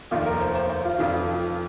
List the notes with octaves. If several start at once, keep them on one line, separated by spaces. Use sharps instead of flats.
F1 D#2 D#3 F4
A#4
C5
C5
C5
F4
F1 F2 F3 F4